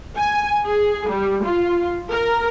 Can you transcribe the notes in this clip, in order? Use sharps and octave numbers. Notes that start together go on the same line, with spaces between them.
G#5
G#4
G3
F4
A#4